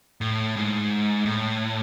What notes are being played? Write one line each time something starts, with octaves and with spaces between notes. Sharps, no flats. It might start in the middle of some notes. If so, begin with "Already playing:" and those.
A2
G#2
A2